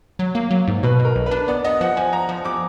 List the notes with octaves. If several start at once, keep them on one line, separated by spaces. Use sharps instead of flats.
F#3
A#3
F#3
G#2
B2 B4
B2
A#4
B1
B4
D4
B3 D5
B3 D#5
F3 F#5
F3 G#5
F3 A#5
F3
F3 D6